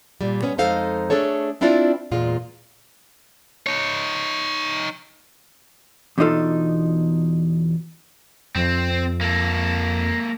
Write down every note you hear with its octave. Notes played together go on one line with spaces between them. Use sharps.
A#2 G3
B3 C#4
F2 G#3 D#4 A4 C5 F5
A3 D4 G#4 A4 C#5
C4 D4 E4 F4 D5
E2 A#2 G#3 F4
D#4 C#5
E2 B2 D4 D#4 F4 A4
F2 C4
A#3 A4